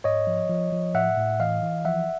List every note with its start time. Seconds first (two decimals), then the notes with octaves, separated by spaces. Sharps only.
0.04 G#2 C#5 D#5
0.27 F3
0.49 F3
0.72 F3
0.94 A2 E5 F#5
1.17 A2
1.40 E3 D#5 F5
1.62 E3
1.85 F3 E5 F#5